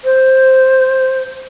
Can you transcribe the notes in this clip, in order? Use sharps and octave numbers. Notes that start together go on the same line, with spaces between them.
C5